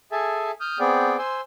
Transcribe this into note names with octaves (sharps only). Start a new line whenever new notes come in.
G#4 A4 E5 G#5 A5
D#6 F6 G6
B3 C4 G#4 D5 G5
C5 G#5 C6 E6